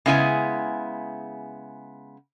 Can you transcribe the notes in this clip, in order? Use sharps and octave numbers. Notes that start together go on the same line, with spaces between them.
C#3 G#3 B3 E4 G4 G#5